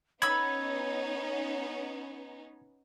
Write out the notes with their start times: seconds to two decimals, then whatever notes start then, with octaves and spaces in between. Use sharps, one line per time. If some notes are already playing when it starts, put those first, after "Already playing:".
0.22 B3 C#4 D#4 C#5 B5 E6 G#6